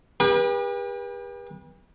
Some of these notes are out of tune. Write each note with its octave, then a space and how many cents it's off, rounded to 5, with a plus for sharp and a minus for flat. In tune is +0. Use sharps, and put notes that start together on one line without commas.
G4 +40 B4 -35 B5 -20